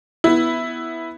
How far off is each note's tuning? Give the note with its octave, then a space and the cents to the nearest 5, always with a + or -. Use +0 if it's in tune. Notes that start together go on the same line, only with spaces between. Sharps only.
B3 +0 E4 +0